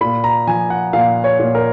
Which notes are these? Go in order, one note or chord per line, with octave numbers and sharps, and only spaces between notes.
A#2 B5
A#5
F3 G#5
F#5
A#2 F5
C#5
A#2
A#4